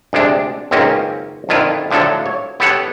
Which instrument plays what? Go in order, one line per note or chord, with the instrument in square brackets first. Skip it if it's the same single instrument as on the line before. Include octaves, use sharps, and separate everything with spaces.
[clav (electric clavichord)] D2 C3 G#3 D4
C#2 F#2 D#3 A#3 C4 C#4
F2 D3 D#3 E4 F4
A2 D3 F3 F#3 A4
C#5
B3 G4 A4 C#5 F#5